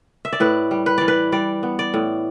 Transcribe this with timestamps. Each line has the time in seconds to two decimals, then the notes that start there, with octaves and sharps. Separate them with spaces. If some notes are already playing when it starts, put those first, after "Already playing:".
0.25 E5
0.33 D5
0.40 A2 B4
0.71 G3
0.86 B4
0.98 E3 D5
1.08 B4
1.32 G3 D5
1.63 B3
1.79 D5
1.94 A2